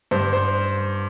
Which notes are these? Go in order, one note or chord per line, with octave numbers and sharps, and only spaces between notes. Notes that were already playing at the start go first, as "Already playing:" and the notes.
G2 C5
C5